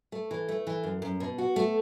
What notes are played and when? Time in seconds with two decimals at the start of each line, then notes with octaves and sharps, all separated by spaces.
0.12 A3
0.31 E3
0.49 A3
0.67 E3
0.83 F#2
1.02 F#2
1.20 B2
1.38 F#4
1.56 A3